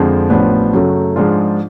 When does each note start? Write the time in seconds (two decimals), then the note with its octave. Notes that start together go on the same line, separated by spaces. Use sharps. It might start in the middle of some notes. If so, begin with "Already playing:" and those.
Already playing: F2 D3 F3 G#3
0.30 A1 A2 F3 B3 D4
0.73 F#2 C#3 F#3 A3
1.16 G#2 F3 G#3 D4 F4